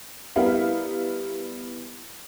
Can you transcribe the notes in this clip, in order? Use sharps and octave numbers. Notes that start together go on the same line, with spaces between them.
G3 B3 E4 A#4 E5 F5